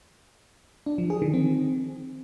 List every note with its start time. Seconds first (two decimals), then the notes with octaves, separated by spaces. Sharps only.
0.86 D4
0.98 F3
1.10 G#4
1.22 D#3
1.34 C4